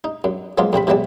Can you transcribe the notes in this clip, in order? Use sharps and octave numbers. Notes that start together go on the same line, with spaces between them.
D#4
F#2
F3 F#3 G#3 A#3 B3 F4
F2 C3 C4 B5
G#2 B2 E3 F#3 G3 A5